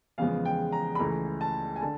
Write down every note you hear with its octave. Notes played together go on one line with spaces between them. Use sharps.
E2 C#3 F3 G#3 B3 F5
G5
A#5
B5
C#2 C#3 E3 A3 A#5
A5
G#5
D3 A5